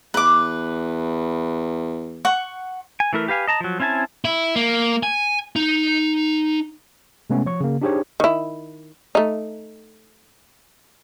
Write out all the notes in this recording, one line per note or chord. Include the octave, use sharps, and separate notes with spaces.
E2 B4 D6
F#5 C#6
G#5
E3 A3 E4 A#4
G4 B4 F5 G#5
D#5 A5 A#5
F3 F#3
C4 C#4 E4 G#5 A5
E4
A#3
G#5
D#4
C3 G#3 A3 B3 C#4
F3 C#5 C#6
C#3 A#3
D4 D#4 G4 G#4 C5 C#5
D#3 E4
A3 D#4